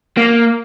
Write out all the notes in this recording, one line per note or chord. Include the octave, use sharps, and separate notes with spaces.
A#3